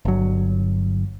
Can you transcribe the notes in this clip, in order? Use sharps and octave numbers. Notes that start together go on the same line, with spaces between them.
G1 F#3